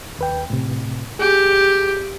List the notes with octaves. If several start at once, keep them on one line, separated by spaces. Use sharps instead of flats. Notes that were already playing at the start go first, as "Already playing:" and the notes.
D#2 B4 G5
A2 C3
G4 G#4